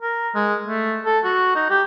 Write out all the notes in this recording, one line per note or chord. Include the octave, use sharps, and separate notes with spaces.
A#4
G#3
A3
A4
F#4
D#4
G4